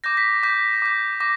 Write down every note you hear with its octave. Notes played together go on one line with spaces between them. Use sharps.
D6 G6 A#6
B6
D6 G6 B6
D6 G6
D6 A#6